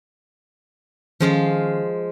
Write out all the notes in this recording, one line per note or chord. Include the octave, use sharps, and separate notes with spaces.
D#3 F3 G#3 C#4 F4 C7